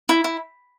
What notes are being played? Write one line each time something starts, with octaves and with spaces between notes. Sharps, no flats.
E4
E4